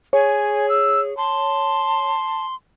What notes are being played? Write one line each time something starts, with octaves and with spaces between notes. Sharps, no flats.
G#4 C#5 G#5
E6
A5 C6